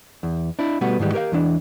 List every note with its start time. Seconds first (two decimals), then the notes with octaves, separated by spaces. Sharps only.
0.23 E2
0.59 D4 E4
0.81 B2 G3 A3 B3 F#4
0.99 G#2 D#3 E3 G3
1.13 G4 A#4 C#5 F5
1.32 E2 E3 D4